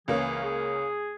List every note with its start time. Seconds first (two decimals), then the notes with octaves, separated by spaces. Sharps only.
0.08 C#2 E3 A#3 C#4 G#4
0.44 G#4